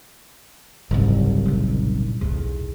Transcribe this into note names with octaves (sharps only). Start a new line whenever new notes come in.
F#1 C2 G#2 F3
A#2 D#3
B1 E2